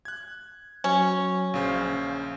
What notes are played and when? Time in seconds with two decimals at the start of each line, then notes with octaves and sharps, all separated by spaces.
0.05 F#6 G#6
0.84 F#3 C#4
1.54 A#1 C#3 C5 F5